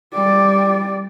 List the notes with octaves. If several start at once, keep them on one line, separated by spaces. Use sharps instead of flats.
G3 D5